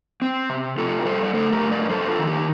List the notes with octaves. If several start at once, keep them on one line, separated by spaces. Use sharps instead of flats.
C4
C3
C3 F4 A4
A#4
G3 A4 C5
D5
A3 A4 C5
G4 A#4
G2
A#4 D5
D5
D4 A4 C5
F4 A4
D#3
D#4 G4